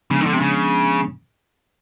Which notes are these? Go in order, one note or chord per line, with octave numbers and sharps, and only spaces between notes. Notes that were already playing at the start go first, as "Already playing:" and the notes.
C#3 F3 G#3 B3 D4
D#3
D3
C3
C#3